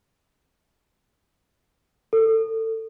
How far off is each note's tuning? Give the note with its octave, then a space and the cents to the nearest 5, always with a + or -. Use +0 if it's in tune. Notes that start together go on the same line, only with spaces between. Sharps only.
A4 +25